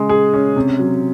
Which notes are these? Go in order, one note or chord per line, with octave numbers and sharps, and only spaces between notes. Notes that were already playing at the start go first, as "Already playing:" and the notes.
Already playing: C#3 G#3
G#4
C#4
C3
F#3